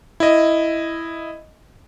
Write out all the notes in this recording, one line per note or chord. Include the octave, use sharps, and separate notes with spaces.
E4 D#5